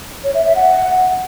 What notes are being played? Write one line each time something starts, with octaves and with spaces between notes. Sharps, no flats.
C#5
E5
E5
F#5